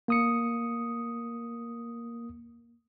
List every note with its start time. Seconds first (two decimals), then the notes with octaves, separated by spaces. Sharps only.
0.08 A#3 D#6 C#7